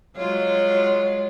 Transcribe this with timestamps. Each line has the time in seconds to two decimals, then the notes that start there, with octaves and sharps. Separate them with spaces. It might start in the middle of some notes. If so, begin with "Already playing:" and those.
0.17 F#3 G#3 F4 C#5